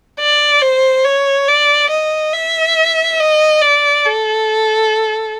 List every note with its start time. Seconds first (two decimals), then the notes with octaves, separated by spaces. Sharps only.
0.20 D5
0.62 C5
1.05 C#5
1.48 D5
1.90 D#5
2.33 E5
3.19 D#5
3.62 D5
4.05 A4